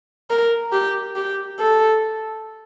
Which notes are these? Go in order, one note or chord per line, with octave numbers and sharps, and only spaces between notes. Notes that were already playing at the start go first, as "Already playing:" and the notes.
A#4
G4
G4
A4